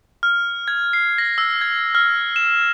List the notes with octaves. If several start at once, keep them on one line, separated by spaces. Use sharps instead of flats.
F6
G#6
C7
A#6
E6
G#6
F6
E7